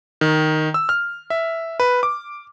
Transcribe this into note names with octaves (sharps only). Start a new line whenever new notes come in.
D#3
E6
F6
E5
B4
D6